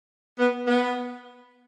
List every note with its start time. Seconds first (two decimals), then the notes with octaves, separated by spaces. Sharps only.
0.39 B3
0.67 B3